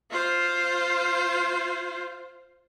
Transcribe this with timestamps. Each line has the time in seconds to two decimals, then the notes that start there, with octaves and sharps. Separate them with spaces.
0.11 F4 C5